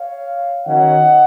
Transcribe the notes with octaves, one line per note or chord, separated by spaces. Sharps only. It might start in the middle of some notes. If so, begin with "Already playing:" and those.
Already playing: C#5 F5
D#3 F#3 C#4 D#5 F#5